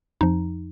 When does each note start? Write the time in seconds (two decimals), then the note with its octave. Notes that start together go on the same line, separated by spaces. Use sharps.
0.21 F2 F3 D#4